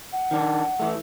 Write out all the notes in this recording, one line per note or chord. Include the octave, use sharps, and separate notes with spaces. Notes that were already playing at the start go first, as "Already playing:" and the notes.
F#5
D#3 D4
E3 A3